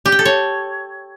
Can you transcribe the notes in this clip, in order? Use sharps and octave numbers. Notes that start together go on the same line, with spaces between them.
G4
G5
A4
C#5